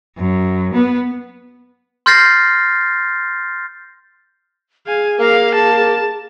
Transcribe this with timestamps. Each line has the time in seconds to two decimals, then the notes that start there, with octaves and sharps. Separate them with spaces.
0.17 F#2
0.74 B3
2.06 C6 F6 G6 A6 A#6 C7
4.87 G#4 F5 G#5
5.19 A#3 F5
5.55 A5